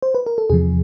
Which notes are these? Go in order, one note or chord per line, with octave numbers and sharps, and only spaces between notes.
C5
B4
A#4
A4
E2 C3 F3 G#4